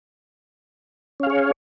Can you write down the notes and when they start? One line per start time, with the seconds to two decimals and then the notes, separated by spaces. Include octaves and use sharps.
1.20 C#4
1.23 F5
1.27 G#4
1.30 C#5